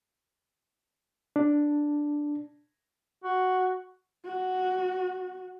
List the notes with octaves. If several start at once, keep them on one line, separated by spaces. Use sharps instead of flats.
D4
F#4
F#4